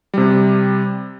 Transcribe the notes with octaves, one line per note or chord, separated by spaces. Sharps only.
C3 G3